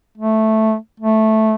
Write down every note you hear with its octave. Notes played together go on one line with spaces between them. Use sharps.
A3
A3